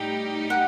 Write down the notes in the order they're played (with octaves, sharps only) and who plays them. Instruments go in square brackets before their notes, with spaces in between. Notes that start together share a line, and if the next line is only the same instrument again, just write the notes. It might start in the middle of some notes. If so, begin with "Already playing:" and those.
Already playing: [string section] A2 G3 D#4 G4
[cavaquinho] F#5